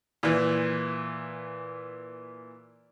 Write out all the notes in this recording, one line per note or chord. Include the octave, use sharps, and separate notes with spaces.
A#2 E3